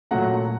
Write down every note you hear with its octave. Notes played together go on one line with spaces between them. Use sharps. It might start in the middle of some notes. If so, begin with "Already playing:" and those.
A#2 F#3 A3 F#5 A#5